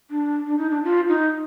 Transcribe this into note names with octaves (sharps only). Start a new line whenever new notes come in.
D4
D4
D#4
D4
F4
D#4